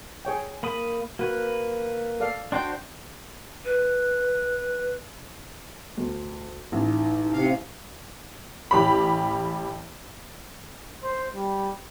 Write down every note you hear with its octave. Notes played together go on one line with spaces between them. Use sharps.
G#4 C#5 G5
A#3 B5 D#6
A#3 F#4 B4
A4 D5 F5
D4 F#4 C5 G5 C6 D6
B4
D2
A1 D#4
C3 F5
A1 G4 B5
C5
G3